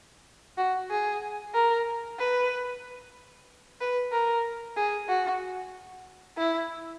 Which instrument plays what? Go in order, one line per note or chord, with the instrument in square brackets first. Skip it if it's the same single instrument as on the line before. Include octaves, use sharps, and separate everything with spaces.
[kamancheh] F#4
G#4
A#4
B4
B4
A#4
G#4
F#4
E4